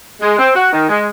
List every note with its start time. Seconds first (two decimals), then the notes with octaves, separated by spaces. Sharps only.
0.21 G#3
0.39 C4
0.56 F#4
0.72 D#3
0.89 G#3